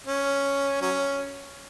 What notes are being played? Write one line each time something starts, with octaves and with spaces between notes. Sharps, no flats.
C#4
F#3 C#4